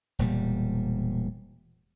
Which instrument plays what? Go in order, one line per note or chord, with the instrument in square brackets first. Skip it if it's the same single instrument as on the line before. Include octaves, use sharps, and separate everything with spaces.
[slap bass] E1 A#2 G3